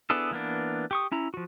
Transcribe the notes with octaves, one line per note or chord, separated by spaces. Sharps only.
B3 D4 E4 G#4 A4
E3 A#3 B3 D4
G4 C#6 D#6
C#4 E4 A#5
F3 F#4